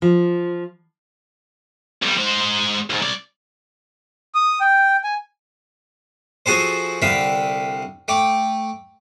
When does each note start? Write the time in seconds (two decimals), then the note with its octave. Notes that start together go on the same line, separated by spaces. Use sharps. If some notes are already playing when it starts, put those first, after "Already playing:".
0.02 F3
2.02 B1 G3
2.17 G#3 C5
2.90 D#2 G#2
3.02 C2 D5
4.35 D#6
4.61 G5
5.04 G#5
6.46 F3 F#4 G#4 A4 C5
7.02 C2 D3 E5 F5 G5
8.08 A3 G5 D6